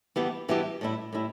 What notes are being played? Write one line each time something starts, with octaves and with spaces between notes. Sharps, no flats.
G2 E3 B3 E4 G4
G2 E3 B3 E4 G4
A2 G3 E4
A2 G3 E4